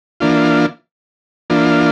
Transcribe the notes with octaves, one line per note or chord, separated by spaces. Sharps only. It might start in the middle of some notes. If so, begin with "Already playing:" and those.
E3 A#3 D4 F4
E3 A#3 D4 F4